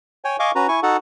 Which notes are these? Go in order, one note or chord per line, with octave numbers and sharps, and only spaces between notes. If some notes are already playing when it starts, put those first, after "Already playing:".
C#5 G5 G#5
D#5 F5 G#5 C#6 D6
C#4 F#4 B4 A#5
E4 G#5 C#6
D#4 F#4 A4 F#5 A5